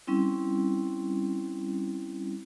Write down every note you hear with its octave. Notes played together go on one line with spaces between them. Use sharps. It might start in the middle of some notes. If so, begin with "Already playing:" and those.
G3 C4 C#4 E4